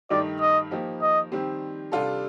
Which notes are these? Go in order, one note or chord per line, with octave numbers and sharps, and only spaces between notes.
G2 D#3 A3 D#4 G4 D5
D#5
F3 A#3 D#4 G4
D#5
D#3 G3 C4 G4
C3 G3 D4 F4 A4